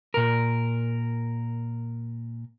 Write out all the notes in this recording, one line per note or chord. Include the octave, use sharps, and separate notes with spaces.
A#2 A#4